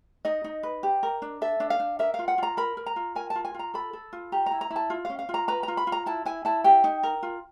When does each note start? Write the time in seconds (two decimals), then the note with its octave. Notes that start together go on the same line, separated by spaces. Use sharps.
0.25 D#4 D#5
0.44 D#4
0.63 B4
0.83 G4
1.03 A#4
1.22 D4
1.42 A4 E5
1.60 D4
1.70 F5
1.80 D4
1.99 A#4 E5
2.14 F5
2.19 F4
2.28 F#5
2.38 F4 A#5
2.57 A#4 B5
2.77 A#4
2.86 A#5
2.96 F4
3.15 A#4 G#5
3.30 A5
3.35 F4
3.45 G#5
3.54 F4 A#5
3.74 A4 B5
3.93 A4
4.13 F4
4.32 G4 A#5
4.46 E4 A#5
4.61 A#5
4.70 E4
4.76 A5
4.90 F4
5.05 F5
5.10 C#4
5.19 F5
5.29 F4
5.34 A#5
5.48 B4 A#5
5.63 F4 A#5
5.77 B5
5.87 F4
5.92 A#5
6.06 E4 A5
6.26 E4 G#5
6.45 E4 A5
6.64 G4 G5
6.84 D#4
7.03 A#4
7.23 F4